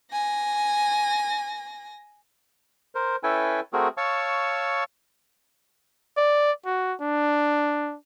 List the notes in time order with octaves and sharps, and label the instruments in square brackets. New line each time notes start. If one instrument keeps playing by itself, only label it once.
[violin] G#5 A#6
[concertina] A#4 C5
C#4 E4 A4 B4 G5 G#5
A3 C4 F#4 G#4 A#4
C#5 F5 A5 C#6 E6
[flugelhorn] D5
F#4
D4